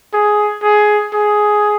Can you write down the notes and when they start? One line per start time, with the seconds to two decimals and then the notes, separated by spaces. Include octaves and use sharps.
0.13 G#4
0.63 G#4
1.13 G#4